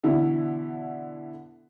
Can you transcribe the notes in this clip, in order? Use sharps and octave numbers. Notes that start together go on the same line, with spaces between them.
B2 D3 E3 E4